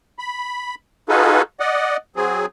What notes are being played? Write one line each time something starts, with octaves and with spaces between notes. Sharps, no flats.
B5
D#4 F4 F#4 G#4 A4 B4
D5 D#5 F#5
F#3 C4 G#4